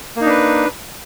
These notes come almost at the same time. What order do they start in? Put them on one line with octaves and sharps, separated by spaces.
A#3 D#4 D4 B4